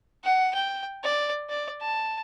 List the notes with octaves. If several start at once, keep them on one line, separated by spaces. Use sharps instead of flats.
F#5
G5
D5
D5
A5